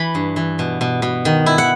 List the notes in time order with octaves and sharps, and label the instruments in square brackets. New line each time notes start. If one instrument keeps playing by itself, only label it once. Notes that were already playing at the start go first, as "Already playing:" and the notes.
Already playing: [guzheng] E3 B5
G2
E3
B2
B2
B2
D#3
E4
F#5